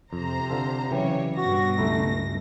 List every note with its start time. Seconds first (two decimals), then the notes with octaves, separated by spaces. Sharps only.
0.13 F2 C3 C5 A#5
0.50 D3 F4 A4
0.91 C#3 E3 F#3 G3 G4 C#5
1.37 G2 B2 F#4 A#6
1.78 C#2 A3 E4 A#5